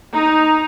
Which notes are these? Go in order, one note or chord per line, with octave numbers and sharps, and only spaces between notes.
D#4